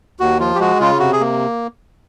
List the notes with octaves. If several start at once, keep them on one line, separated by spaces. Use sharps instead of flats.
D#2 F#4
F3 F4
G4
G#3 F#4
C#3 F4
C3 F#4
G#4
A#3